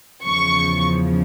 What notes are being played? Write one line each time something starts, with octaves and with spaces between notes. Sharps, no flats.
E2 C#3 F3 C#6